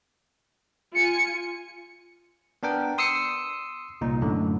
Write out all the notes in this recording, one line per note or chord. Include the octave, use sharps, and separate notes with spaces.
F4 G#5 C#7
B3 D4 A#4 G5
C6 D#6 E6 C7 C#7
C2 A#2 D#4
F#2 A2 D3